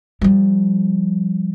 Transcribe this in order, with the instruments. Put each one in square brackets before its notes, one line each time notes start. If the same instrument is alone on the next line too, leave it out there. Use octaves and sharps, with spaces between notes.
[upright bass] F3 G3